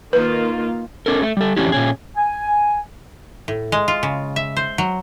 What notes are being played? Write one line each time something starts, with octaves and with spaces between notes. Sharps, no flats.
D#3 A#3 F4 B4
C#4 A4 A#4
A3
G3 A4
F2 E3 C#4 D4 E4 G4
A#2 C#4 G#4
G#5
A2
G#3
F4
C#3
E5
C5
F#3